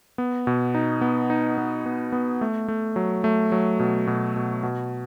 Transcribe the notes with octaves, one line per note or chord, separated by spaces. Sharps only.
B3
B2
D#4
B3
D#4
B3
B3
B3
A3
A3
F#3
A3
F#3
B2
B2
B2
B2